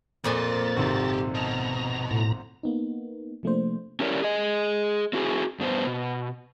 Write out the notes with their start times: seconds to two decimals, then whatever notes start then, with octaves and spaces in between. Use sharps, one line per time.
0.24 F2 A#2 A#3 G#5 C6 A6
0.77 G#1 G#2 C3 F#4 G4
1.35 B2 A#5
2.11 A2 A#5
2.63 A#3 B3 D#4
3.43 C3 F3 A3 A#3 D4 C5
4.00 C#4 E4 G4 A#4 C#5 D5
4.23 G#4 D#5
5.13 C4 E4 F#4 G#4
5.59 G2 B3 C5
5.87 B2